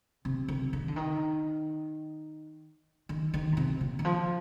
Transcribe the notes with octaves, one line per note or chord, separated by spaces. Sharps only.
C3
C3
D#3
D3
D#3
D#3
D#3
A#2
C3
A#2
D#3
F3